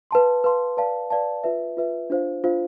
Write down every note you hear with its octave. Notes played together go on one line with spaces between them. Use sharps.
B4 F5 A5 C6
B4 F5 A5 C6
B4 D5 F5 A5
B4 D5 F5 A5
F4 B4 E5
F4 B4 E5
D4 F4 C5 F5
D4 F4 C5 F5